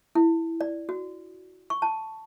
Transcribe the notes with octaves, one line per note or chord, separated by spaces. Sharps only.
E4
D5
F#4
C#6
A5